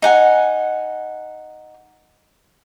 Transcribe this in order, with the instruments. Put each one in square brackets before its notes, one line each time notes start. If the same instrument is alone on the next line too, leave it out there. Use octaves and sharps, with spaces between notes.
[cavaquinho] D#4 F#5 G#5